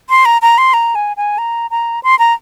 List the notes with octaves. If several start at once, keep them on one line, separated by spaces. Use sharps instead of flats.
C6
A#5
A#5
C6
A#5
G#5
G#5
A#5
A#5
C6
A#5